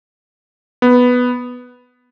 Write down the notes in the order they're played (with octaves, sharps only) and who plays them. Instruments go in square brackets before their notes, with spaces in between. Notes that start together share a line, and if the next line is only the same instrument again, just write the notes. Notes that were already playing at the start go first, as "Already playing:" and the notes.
[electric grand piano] B3